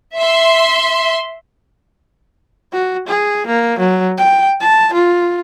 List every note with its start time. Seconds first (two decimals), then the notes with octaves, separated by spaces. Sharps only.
0.18 E5 C6
2.73 F#4
3.08 G#4
3.47 A#3
3.79 F#3
4.18 G5
4.61 A5
4.94 F4